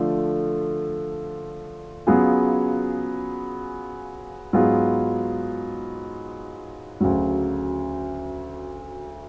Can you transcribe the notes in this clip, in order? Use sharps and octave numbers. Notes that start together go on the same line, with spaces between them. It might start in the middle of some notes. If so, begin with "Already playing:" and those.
Already playing: D3 F3 A3 F4
C#3 F#3 B3 F4 G#4
G#2 F#3 B3 F4 G#4
D2 C#3 F#3